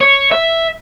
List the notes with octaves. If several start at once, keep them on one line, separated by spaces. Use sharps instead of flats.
C#5
E5